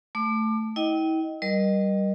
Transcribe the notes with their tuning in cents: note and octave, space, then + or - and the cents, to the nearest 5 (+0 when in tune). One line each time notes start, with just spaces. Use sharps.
A3 +0 D6 +30
E4 -40 D#5 +0 G5 -20
G3 -15 A#4 +25 D#5 -20